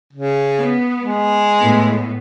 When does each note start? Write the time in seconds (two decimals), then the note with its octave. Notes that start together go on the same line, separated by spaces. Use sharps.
0.13 C#3
0.57 B3
1.00 G#3
1.59 A2 B3